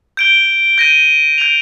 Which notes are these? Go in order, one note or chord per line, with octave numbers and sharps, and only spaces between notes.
G6 D7 G7
G6 A#6 D#7
G6 D7 F7